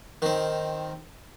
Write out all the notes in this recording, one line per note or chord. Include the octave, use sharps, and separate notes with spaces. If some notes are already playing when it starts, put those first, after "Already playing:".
D#3 C4